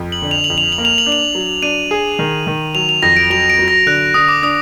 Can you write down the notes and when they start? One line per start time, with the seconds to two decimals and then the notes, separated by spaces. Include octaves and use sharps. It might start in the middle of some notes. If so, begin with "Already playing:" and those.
Already playing: F2
0.12 F#7
0.22 D3
0.31 F7
0.44 F#7
0.50 F2
0.58 F7
0.72 F#7
0.78 A#3
0.85 F7
0.98 F#7
1.06 D4
1.12 F7
1.35 F#3
1.62 D4 D#7
1.91 G#4
2.19 D#3
2.47 D#3
2.75 F#3 F7
2.89 F7
3.02 F2 A#6
3.17 D7
3.30 F#3 F7
3.50 D7
3.59 F#3
3.68 A#6
3.86 D3 F#6
4.14 D3 D#6
4.28 D6
4.42 D4 D#6